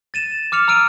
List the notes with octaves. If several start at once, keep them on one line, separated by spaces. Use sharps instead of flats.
A6 D#7 E7
D6 F6 C#7 F7
A#5 E6 F6 D7 D#7